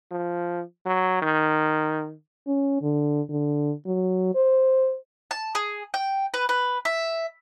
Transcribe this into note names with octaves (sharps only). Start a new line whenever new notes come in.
F3
F#3
D#3
C#4
D3
D3
F#3
C5
A5
G#4
G5
B4
B4
E5